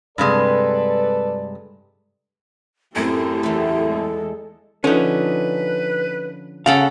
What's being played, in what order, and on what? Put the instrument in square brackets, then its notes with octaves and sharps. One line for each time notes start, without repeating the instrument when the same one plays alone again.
[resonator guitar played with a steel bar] G2 C3 G#3 [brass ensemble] A4 B4 D5
[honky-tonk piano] F#2 A2 C4 [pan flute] E4 [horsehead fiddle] G4 A4
[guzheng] E2 A3
[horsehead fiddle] G#3 A4
[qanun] D3 D#4 [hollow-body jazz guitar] F3 C#4 [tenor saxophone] B4
[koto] C#3 A4 [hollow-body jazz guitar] F5 [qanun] F#5 A#5